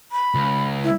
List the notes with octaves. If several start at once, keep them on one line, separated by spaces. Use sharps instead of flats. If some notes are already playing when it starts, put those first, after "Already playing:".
B5
C#2
E4